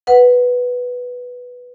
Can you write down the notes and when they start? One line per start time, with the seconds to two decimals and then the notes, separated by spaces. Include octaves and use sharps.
0.07 B4 F#5